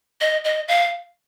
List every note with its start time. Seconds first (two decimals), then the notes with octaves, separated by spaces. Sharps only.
0.21 D#5
0.44 D#5
0.68 F5